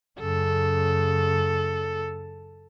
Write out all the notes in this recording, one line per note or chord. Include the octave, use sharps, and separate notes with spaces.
F#2 C#3 A4